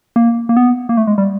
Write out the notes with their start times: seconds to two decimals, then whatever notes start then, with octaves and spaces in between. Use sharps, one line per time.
0.16 A#3
0.49 A#3
0.57 B3
0.89 A#3
0.97 A3
1.07 G#3
1.18 G3